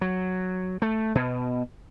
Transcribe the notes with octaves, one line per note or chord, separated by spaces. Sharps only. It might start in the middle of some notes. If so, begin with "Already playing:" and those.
F#3
A3
B2